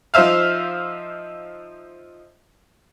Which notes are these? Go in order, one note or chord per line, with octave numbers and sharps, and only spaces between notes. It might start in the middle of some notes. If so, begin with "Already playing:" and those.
F3 D#4 C5 E5 F5